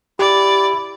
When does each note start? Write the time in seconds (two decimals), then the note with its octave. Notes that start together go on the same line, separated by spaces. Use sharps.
0.19 E4 G4 D5